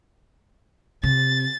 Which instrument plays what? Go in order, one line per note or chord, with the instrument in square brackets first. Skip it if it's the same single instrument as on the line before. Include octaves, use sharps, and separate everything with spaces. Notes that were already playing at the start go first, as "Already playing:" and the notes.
[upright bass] C3 [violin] A6